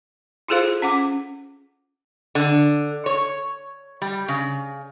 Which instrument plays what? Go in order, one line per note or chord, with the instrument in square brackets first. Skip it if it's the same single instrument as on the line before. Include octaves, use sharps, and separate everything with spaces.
[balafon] E4 F4 G#4 A4 C5 F5
C#4 F#5 D6
[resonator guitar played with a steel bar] D3
C#5
G3
C#3